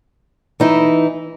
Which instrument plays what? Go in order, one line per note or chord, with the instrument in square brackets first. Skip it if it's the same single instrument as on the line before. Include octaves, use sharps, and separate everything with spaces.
[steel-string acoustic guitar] E3 D#4 E4